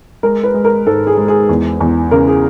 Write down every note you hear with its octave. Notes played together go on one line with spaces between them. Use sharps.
G#3 A#4
B4
G#3
A#4
G#2 A4
G#4
G#3
G#4
E2
E2
C#3 A#4
G#4